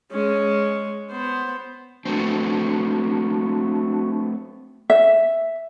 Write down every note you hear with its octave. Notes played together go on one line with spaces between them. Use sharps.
G#3 C#4
B3 C5
A3 B3 C4 D4 F#4
E5